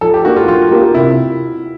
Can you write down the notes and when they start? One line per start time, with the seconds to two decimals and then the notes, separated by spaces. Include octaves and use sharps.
0.01 F3 A4
0.14 G4
0.25 A#3 D4 F#4 G4 A#4
0.36 F4
0.48 F3 F4
0.71 A#3 D4 G4 A#4
0.94 C3 E4